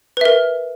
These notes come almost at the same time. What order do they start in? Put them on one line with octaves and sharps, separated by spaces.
B4 E5 A#4